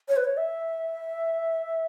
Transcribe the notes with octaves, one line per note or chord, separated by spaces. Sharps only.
C#5
B4
C#5
E5